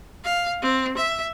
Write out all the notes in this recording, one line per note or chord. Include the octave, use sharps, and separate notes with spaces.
F5
C4
E5